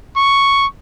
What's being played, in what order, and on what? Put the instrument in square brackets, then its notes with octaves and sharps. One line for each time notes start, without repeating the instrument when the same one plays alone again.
[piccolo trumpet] C#6